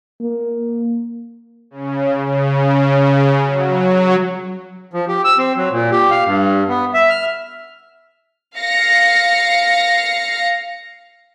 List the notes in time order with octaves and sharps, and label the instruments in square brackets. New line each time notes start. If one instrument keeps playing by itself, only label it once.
[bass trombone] A#3
[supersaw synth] C#3
C#3
F#3
[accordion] F3
G4
E6
C4
F#3
A#2
G4
F5
G2
B3
E5
F6
[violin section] F5 A#6 C#7